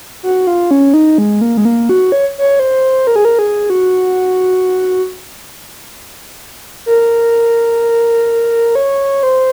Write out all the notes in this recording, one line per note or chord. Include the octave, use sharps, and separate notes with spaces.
F#4
F4
C#4
D#4
G#3
A#3
G#3
A#3
F#4
C#5
C#5
C5
A#4
G#4
A#4
G#4
F#4
A#4
C#5
C5